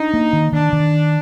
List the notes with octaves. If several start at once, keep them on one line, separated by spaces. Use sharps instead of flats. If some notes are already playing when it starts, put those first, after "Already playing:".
Already playing: D4 D#4
A#3
D#3
D#3 D4
D#3